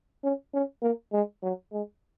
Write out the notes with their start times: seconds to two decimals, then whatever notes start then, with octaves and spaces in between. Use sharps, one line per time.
0.24 C#4
0.54 C#4
0.82 A#3
1.12 G#3
1.43 F#3
1.72 G#3